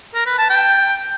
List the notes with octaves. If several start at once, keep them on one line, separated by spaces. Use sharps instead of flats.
A#4
B4
A5
G5